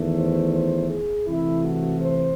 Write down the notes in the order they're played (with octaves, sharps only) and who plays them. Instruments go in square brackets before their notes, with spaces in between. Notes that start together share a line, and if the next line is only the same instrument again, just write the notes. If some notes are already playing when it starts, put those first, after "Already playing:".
Already playing: [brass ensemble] E2 D#3 A3
C5
C5
G#4
C3 E3 A3 E4
F#4
C5